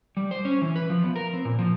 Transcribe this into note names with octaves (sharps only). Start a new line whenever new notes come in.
G3
C5
C#4
E3
B4
F3
B3
A#4
C4
A#2
F3